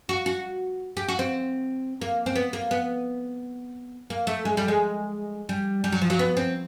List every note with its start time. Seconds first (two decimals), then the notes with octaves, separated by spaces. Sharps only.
0.09 F#4
0.26 F#4
0.97 G4
1.08 F#4
1.19 C4
2.01 A#3
2.26 C4
2.36 B3
2.53 A#3
2.71 B3
4.10 A#3
4.27 A3
4.45 G#3
4.57 G3
4.68 G#3
5.49 G3
5.84 G3
5.92 F#3
6.02 F3
6.10 F#3
6.19 B3
6.37 C4